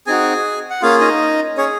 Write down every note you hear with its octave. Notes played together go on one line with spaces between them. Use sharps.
C4 D#4 F#4 G#4 G#5
F#5
A#3 C#4 F4 G#4 F5
D#4 D#5
C#4 G#4 C#5